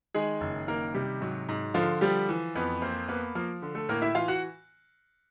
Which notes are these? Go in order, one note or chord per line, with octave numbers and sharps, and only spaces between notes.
D#3 G#3 G#4
F#1
D#3 A#3 A#4
C3 G3 G4
G#2 F#3 F#4
G#2
D3 F3 F4
F3 G3 G4
E3
F2 B3 B4
A#3 C4 C5
A#3 B3 B4
F3 A#3 A#4
D3
A3 A4
A2 A#3 A#4
E4 E5
E3 F4 F5
F#4 F#5